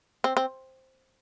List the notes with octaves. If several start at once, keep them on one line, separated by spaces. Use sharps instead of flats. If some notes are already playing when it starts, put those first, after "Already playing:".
C4
C4